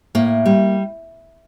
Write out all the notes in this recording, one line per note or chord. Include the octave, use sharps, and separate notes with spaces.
A2 A#3
G3